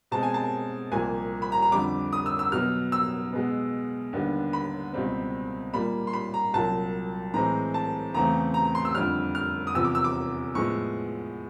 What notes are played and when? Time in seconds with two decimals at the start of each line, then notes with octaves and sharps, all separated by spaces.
0.11 B2 G#3 C4 A5
0.23 G#5
0.34 A5
0.92 C2 A#2 F3 A#3 G#5
1.42 B5
1.52 A#5
1.62 A#5
1.72 F2 D3 G3 D6
2.13 D#6
2.26 E6
2.39 E6
2.52 B2 F#3 B3 F6
2.92 E6
3.33 B2 G#3 B3
4.13 D#2 D3 G3 B3
4.53 B5
4.93 C#2 B2 G3 C4
5.73 A#2 G3 A#3 B5
6.07 C6
6.13 B5
6.34 A#5
6.54 C2 A#2 F#3 A5
7.34 A2 E3 G#3 C4 A#5
7.74 A5
8.14 E2 C#3 E3 A3 C4 A#5
8.54 A#5
8.65 A#5
8.75 C6
8.85 E6
8.95 F2 D3 G3 F6
9.35 F6
9.67 D#6
9.75 E2 C3 F3 E6
9.85 D6
9.95 E6
10.04 D6
10.55 A2 F3 G#3 B3 C#6